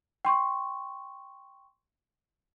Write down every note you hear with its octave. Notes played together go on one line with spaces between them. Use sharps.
G5 C6 C#6